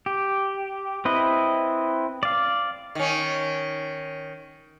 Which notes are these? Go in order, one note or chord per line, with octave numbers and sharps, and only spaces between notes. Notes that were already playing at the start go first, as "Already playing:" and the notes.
G4
C4 E4 B4 D#5
D5 F5
D#3 C#4